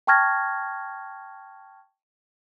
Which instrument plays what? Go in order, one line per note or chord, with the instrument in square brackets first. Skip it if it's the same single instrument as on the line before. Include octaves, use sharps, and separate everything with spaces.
[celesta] G5 A5 C#6 F6 G#6 A#6